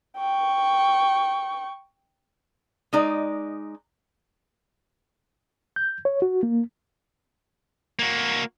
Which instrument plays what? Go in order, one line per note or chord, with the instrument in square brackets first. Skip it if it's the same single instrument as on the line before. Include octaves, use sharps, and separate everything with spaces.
[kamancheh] G5 C#6
[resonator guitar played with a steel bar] G#3 D#4 D5
[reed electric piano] G6
C#5
F#4
A#3
[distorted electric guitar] A#3 F#4